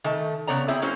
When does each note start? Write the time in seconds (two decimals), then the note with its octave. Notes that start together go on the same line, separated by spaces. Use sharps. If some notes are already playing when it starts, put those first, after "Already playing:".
0.04 D#3 A3 A5
0.47 C#3 F3 B3 C#5 D5 A#5
0.68 C4 E4 G#4 E5
0.82 F#3 A#3 C#4 C5